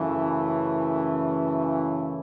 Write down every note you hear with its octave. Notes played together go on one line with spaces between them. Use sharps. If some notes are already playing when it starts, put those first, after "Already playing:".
Already playing: F#2 C#3 E3 A3
C#5